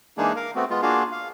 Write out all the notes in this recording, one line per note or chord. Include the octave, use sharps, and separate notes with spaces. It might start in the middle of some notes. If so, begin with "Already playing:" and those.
E3 G#3 A#3 D4 D#4 G#4
A#4 F5
A3 B3 C4 F#4
G#3 B3 F4
A#3 D4 F4 F#4 G#4 F5
F5